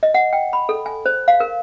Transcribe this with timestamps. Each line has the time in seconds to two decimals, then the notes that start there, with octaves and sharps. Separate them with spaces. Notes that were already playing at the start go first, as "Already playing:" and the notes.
0.03 D#5
0.14 F#5
0.33 G5
0.53 B5
0.69 A4
0.86 G#5
1.06 C5
1.28 F5
1.40 A#4